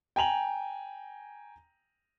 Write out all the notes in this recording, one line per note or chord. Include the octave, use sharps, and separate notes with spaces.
G5 G#5 A#5 F7 F#7